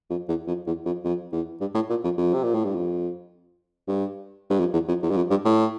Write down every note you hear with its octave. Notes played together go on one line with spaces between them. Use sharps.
F2
E2
F2
E2
F2
F2
E2
G2
A2
A#2
F2
F2
C3
A#2
A2
G2
F2
G2
G2
F2
E2
F2
E2
G2
F2
G2
A2